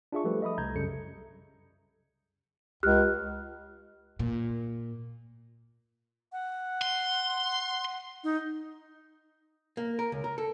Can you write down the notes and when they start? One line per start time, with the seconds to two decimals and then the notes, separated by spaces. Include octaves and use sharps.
0.12 D4 F4 G#4 E5 C#6
0.24 F3 G3 A3 G4 A4 B4
0.42 D#5 E5 B5 D#6
0.58 C2 A#5 G6 G#6
0.75 F#2 C#3 G3 A4 C#7
2.83 C#2 G4 F6 F#6
4.19 A#2
6.32 F#5
6.82 C6
8.24 D#4
9.77 A#3
9.99 A#4
10.12 C#2
10.24 A#4
10.38 A4